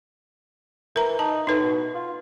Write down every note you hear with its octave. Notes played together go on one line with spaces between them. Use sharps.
E3 A#4 A#5
D#4 A5
A2 D#4 B4
B2
F4